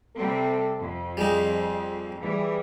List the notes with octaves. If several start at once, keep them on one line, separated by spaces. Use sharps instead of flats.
C3 G3 C4 A4
F2
G3 G#3 D#4 G#4
E3 G3 G#4